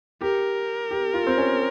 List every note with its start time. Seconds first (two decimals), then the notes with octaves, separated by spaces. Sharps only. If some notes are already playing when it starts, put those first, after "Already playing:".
0.21 G4 A#4
0.91 G4
1.14 F4
1.27 C4
1.38 C#4